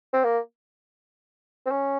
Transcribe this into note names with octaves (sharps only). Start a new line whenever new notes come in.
C4
A#3
C4
C#4